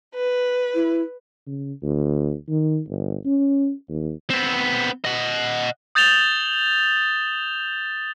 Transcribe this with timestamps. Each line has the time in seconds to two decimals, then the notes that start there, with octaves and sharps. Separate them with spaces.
0.14 B4
0.75 E4
1.47 C#3
1.82 D2
2.49 D#3
2.88 G1
3.25 C#4
3.88 D#2
4.30 B3 C4
5.05 D#5 F#5
5.95 D#6 G6 A6 E7 F7 G7